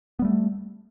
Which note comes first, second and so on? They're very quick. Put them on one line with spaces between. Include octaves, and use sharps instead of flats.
B3 G3 A3